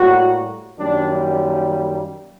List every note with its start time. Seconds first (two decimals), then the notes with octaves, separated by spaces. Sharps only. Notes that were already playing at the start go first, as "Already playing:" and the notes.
Already playing: A2 G3 A#3 F#4
0.77 F#2 D#3 G3 A#3 D4